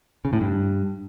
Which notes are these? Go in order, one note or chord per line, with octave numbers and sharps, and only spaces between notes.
C#3
A2
G2